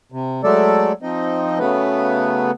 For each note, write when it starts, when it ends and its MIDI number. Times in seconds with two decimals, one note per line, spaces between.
0.12 0.41 48
0.44 0.92 54
0.44 0.92 56
0.44 0.92 57
0.44 0.92 69
0.44 0.92 74
1.02 1.59 53
1.02 1.59 60
1.02 1.59 63
1.02 1.59 75
1.59 2.51 49
1.59 2.51 54
1.59 2.51 57
1.59 2.51 59
1.59 2.51 71